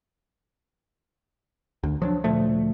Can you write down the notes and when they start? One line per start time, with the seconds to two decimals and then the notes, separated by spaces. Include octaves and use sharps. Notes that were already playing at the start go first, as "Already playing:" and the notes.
1.83 D2
2.02 F3 F#3 D4
2.24 D2 A#2 F3 A3